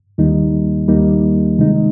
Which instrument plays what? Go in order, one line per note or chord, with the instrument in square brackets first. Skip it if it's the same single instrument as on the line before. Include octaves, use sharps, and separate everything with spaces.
[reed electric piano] D#2 D#3 G3 A#3 D#4
D#2 D#3 G3 A#3 D#4
C3 D#3 G#3 D#4